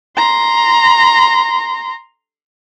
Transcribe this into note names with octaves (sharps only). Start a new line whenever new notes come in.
A#5 C6